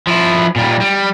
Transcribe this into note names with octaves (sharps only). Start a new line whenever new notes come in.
F3 E4
A#2 G3
G3